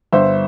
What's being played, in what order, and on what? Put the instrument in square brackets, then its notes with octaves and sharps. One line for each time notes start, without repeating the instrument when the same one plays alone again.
[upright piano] G1 C5 E5